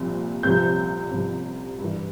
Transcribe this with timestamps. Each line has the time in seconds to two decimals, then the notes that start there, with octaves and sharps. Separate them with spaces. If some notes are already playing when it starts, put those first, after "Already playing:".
Already playing: C2 A#2 F3
0.43 C2 C3 F3 G6
1.11 C2 C3 F3
1.79 G2
1.84 E3